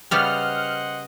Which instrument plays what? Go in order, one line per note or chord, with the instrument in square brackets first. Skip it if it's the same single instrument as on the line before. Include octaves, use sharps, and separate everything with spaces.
[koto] C#3 G3 B3 [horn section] C5 D#5 F#5 [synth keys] F6